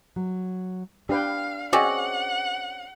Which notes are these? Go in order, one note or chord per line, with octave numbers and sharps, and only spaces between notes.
F#3
D4 G4 B4 F5 G5
C4 C#4 F#4 G#4 D5 D#5 F#5